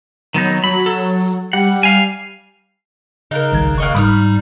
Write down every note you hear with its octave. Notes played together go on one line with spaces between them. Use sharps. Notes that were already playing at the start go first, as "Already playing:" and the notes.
D#3 F#3 B3 D#4
F#3 B5
A4
G3 F#5
F5 G#5
C#3 D#4 A#4 F#6
G1 C2 D#3 G#6
F1 A#3 D#5 C#6
G#2 G3 D#4 B5 D#6 F6